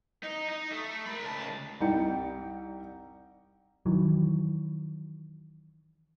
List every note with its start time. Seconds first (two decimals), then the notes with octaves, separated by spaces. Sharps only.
0.23 D#4
0.49 D#4
0.72 A3
1.07 A#4 B5
1.24 C#2 A5
1.81 C2 G3 D#4 G5 C#7
3.86 D#3 E3 F#3